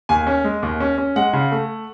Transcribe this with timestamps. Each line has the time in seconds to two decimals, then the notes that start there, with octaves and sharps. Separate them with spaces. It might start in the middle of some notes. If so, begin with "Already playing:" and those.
0.09 D#2 G#5
0.27 C#4
0.44 G#3
0.62 D#2
0.80 C#4
0.98 C#4
1.16 G#3 F#5
1.33 C#3
1.52 A3